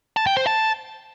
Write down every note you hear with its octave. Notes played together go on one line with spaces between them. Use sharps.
A5
G5
C5
A5